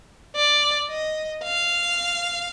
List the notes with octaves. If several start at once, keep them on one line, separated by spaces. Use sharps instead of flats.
D5
D#5
F5